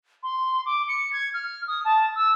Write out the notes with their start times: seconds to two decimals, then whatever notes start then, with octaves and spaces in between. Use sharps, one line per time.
0.23 C6
0.65 D6
0.88 C#7
1.13 G#6
1.34 F6
1.67 D#6
1.85 A5
2.15 E6